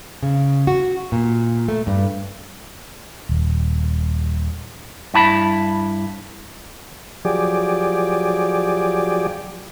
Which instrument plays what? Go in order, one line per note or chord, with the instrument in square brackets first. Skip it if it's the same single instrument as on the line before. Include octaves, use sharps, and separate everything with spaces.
[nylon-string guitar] C#3
F#4
A#2
A3
G2
[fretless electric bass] D#1
[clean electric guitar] G2 E4 A5 B5
[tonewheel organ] F3 F#3 G4 G#4 D5